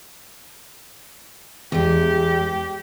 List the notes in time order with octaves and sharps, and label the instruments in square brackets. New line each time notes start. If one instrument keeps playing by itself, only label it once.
[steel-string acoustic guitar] E2 G#3 [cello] G4